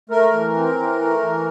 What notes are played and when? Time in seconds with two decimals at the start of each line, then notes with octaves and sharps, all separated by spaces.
0.10 A3 A#4
0.33 E3
0.55 C4
0.77 E3
1.00 A3
1.21 E3